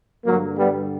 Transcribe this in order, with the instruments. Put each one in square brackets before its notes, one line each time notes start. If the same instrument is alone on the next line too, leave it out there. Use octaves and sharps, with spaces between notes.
[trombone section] G2 D3 F#3 A#3
G3 B3